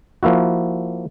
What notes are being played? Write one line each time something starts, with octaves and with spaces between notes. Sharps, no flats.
F3 A#3 E4 F#4